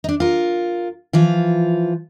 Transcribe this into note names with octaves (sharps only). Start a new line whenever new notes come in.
D4 D#4
F4 A#4
E3 F3 F4